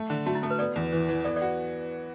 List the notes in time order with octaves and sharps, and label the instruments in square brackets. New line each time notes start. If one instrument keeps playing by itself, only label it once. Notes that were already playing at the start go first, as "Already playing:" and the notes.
Already playing: [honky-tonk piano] A3
D3
[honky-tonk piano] A3 [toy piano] F#4
[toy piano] E4
[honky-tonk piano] A3 [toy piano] A4
[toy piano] B4
[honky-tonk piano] B3 [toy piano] A4 D5
[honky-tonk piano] E2
E3
E3
[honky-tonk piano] B3 [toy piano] A4 D5
[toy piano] A4 D5
[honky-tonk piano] F#4